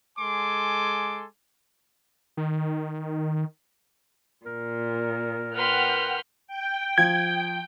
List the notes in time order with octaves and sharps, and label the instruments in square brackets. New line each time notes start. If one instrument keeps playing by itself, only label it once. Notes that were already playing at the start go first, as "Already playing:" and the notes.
[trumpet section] G#3 A4 G#5 C6 D6
[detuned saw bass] D#3
[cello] A#2 [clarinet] A#4
[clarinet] A#4 [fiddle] B4 C6 [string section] F#5 G5 F6
[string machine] G5
[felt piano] F3 [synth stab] G#6